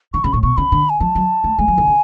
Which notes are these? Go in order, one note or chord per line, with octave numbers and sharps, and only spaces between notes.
D3 C#6
C#3 B5
A2 C#6
B2 C#6
C#3 B5
D3
G#5
F3 A5
F#3
A3
G#3 G#5
F#3
D3
C#3